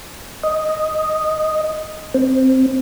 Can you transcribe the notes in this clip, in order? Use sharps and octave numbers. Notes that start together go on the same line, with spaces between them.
D#5
C4